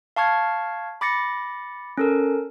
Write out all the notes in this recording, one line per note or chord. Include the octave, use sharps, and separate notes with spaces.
F5 A5 C#6 F6 G#6
B5 D6 A6 A#6 C#7
C#4 A4 A#4